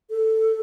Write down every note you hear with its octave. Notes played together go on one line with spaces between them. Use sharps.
A4